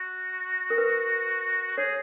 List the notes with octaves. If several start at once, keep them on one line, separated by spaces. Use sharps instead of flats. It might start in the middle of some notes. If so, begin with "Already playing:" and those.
Already playing: F#4
A#4
B4
G#4 C#5